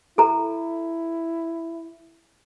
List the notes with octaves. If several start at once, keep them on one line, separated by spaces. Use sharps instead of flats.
E4 A4 A#5